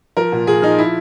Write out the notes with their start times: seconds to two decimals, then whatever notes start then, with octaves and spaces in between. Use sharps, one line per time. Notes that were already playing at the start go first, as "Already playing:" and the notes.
0.17 F3 A#4
0.32 A#2
0.47 A#2 G#4
0.62 F3 D#4
0.78 E4